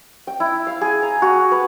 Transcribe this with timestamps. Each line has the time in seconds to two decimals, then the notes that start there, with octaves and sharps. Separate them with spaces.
0.27 G5
0.40 E4
0.67 F5
0.81 G#4
1.03 A#5
1.22 F#4
1.52 B4